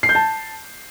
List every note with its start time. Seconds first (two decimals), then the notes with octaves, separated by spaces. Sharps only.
0.03 C7
0.09 G6
0.15 A5